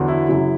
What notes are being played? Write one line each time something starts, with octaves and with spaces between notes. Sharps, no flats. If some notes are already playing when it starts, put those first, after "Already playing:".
Already playing: E2 D3 F#3
E4
F#2 C#3 F#3